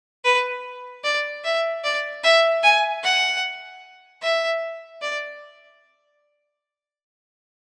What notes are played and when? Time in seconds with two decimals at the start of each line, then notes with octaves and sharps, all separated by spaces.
0.24 B4
1.04 D5
1.44 E5
1.84 D5
2.24 E5
2.63 G#5
3.03 F#5
4.22 E5
5.02 D5